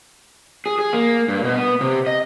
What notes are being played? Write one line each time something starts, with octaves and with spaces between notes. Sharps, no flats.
G#4
G#4
A#3
G2
B2
B3
C3
D#5